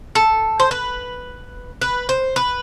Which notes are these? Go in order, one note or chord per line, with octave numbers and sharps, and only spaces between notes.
A4
C5
B4
B4
C5
B4